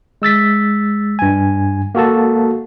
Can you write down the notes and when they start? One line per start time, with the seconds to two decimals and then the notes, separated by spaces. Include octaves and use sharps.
0.22 G#3 E6 A6 B6
1.19 G2 G#5
1.95 A#3 F#4 A4 A5